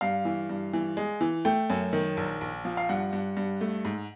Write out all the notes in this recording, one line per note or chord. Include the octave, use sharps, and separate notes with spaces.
G2 F5
E3
G2
E3
G#3
E3
A3 G5
F#2
D#3
A#1
A#1
F3
F5
G2 F#5
G2
G2
A3
G#2